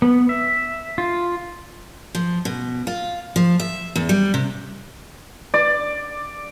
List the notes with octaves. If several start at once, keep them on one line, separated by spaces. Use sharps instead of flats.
B3
E5
F4
F3
B2
F4
F3
E5
E2
G3
C3
D5